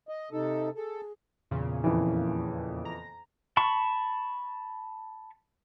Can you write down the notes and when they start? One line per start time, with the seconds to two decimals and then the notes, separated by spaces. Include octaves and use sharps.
0.09 D#5
0.31 C3 D#4 A4
0.76 G#4 A4
1.51 E2 A#2 C#3
1.84 F2 E3
2.85 A#5
3.57 A5 B5 C#6